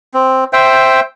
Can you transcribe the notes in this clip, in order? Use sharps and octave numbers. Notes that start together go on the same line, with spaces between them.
C4
C5 E5 G5